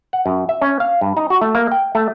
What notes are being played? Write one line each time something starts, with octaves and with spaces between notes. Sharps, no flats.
F#5
F#2
E5
C#4
F5
G2
D#4
F#4
A3
A#3
G5
A3